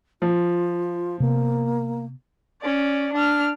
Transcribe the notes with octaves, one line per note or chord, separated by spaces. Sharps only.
F3 F4
C3 A#3 B3
C#4 D5
D4 F6